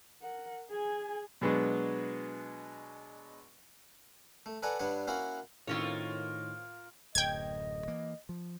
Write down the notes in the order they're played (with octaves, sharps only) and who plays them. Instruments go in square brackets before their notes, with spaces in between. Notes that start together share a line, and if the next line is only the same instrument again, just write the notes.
[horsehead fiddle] A#4 F#5
G#4 G#5
[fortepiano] B2 F#3 G#3 B3 D4 G#4
[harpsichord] A3
A4 B4 D5 F#5 G#5 A#5
G2 G3 D4 B4 C#5 F#5
A#3 C#4 E4 F#4 F5 F#5
[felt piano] A2 D#3 [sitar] A#3 F4 [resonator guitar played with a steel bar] C4 C#4 C#5
[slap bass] D1 F#2 [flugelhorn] D#5 [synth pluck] G5 G#6
[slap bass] E3 A#3
F3